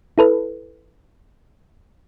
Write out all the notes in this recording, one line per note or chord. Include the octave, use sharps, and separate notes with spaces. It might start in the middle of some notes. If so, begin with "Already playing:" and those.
E4 A4 B4